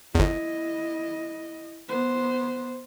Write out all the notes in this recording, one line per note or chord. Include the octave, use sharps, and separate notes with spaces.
G1 E2 E4 D#5
B3 C5